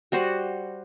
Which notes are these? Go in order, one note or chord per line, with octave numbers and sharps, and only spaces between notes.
G3 F#4 C5